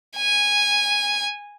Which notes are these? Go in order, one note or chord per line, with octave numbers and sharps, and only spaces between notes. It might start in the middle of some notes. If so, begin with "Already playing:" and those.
G#5